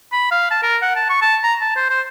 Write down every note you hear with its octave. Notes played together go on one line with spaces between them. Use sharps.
B5
F5
A5
A#4
F#5
A5
C#6
A5
A#5
A5
C5
C5